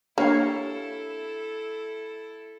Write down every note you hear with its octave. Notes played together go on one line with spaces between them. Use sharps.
A#3 D4 E4 G4 A4 C#5 F5